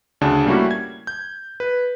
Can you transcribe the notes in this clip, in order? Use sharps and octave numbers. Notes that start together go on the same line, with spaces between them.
D2 C#3 D4 A5
G3 A3 A#3 C#4 E4 F#4
G#6
G6
B4